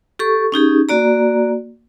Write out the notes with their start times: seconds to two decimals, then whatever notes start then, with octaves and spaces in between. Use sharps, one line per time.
0.19 G4 A4 C#6
0.52 C#4 D#4 G4 G#4
0.89 A#3 F#4 D5 A#5